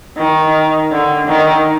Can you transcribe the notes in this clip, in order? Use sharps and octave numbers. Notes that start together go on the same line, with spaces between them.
D#3
D3
D#3